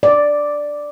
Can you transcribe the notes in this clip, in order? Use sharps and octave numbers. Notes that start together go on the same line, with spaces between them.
D5